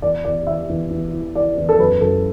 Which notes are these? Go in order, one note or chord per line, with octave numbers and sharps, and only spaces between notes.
E2 D5
E2 D5
E2 E5
E2
E2
E3
E3 D5
E2
A4
F#2 B4
F#2 A4